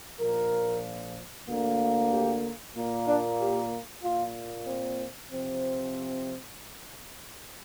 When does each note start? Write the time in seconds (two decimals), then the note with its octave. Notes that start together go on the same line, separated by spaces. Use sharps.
0.19 A#1 A#2 F3 A#4
1.48 D2 D3 A#3
2.11 G4
2.75 A#2 A#3
3.07 D4
3.40 G4
4.03 A#2 A#3 F4
4.67 C4
5.31 C3 F3 C4